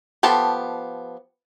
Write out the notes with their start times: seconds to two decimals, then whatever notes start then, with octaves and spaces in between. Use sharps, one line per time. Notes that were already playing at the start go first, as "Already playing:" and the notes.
0.23 F3 B3 G4 A4 A5